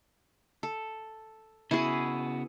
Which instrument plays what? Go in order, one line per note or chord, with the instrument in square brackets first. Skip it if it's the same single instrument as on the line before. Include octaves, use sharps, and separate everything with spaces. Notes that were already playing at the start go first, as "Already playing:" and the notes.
[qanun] A4
[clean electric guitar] C#3 B3 F#4 [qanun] E4 G#4